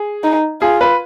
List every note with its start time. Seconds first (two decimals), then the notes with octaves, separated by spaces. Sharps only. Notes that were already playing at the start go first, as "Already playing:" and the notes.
Already playing: G#4
0.24 D#4
0.61 F4 G#4
0.81 B4